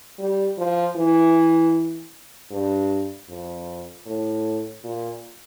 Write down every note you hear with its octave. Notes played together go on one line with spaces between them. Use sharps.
G3
F3
E3
G2
F2
A2
A#2